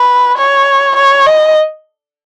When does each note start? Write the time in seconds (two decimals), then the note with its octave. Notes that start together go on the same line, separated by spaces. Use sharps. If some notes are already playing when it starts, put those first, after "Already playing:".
Already playing: B4
0.38 C#5
0.96 C#5
1.26 D#5